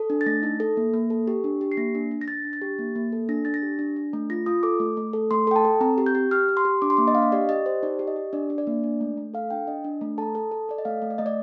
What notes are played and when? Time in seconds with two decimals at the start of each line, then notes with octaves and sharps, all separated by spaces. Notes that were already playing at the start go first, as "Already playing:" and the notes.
Already playing: A4
0.10 D4
0.21 A6
0.26 A3 A#6
0.43 D#4
0.60 A4
0.77 A#3
0.94 A#3
1.10 A4
1.28 G4
1.44 D4
1.61 G4
1.72 C7
1.77 A#3 A#6
1.95 D4
2.11 D4
2.21 A#6
2.28 D4 A6
2.45 D4
2.53 A6
2.62 G4
2.79 A#3
2.95 A#3
3.12 A4
3.29 D4 A#6
3.45 D4 A6
3.54 A#6
3.62 G4
3.79 D4
3.96 D4
4.13 A3
4.30 F4 A#6
4.46 F4 D#6
4.63 A4 D6
4.80 A3
4.97 A3
5.13 A4
5.31 A3 C6
5.47 A4 G5
5.56 A5
5.65 A4
5.81 C4 A#5
5.98 G4
6.06 G6
6.15 G4
6.31 G4 F6
6.49 G4
6.57 C6
6.65 G4
6.82 D4 D6
6.90 C6
6.97 A#3 D6
7.08 D#5
7.15 D4 F5
7.22 D#5
7.32 G4 D5
7.49 G4 D#5
7.66 G4 C5
7.83 D#4 D5
7.99 G4
8.07 D#5
8.16 G4
8.33 D4 D5
8.50 D4
8.58 D5
8.67 A#3
8.84 D4
9.01 A3
9.17 A3
9.34 A4 F5
9.50 D4 G5
9.67 D4 D#5
9.84 D4
10.01 A3
10.18 A4 A5
10.22 A#5
10.35 A4 A5
10.51 A4
10.69 A4 D5
10.78 D#5
10.85 A3 F5
11.02 A3
11.10 D5
11.18 A3 D#5
11.26 D5